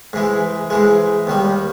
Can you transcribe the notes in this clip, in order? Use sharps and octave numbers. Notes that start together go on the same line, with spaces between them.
G#2 E3 G#3
G#2 E3 G#3
D#2 D#3 G3